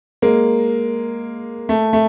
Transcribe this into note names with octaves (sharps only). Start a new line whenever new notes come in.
G#3 A#3
A3
A3